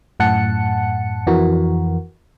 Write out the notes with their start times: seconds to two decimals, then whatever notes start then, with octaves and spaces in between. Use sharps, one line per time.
0.20 F#2 A2 F#5 A5 C#7
1.27 F2 E3 F#4 A#4